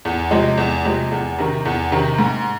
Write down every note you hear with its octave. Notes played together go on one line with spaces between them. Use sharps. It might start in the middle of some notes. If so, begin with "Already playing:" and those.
E2
C3 F3 G#3
E2
C3 F3 G#3
E2
C3 D#3
E2
C3 D#3
G#2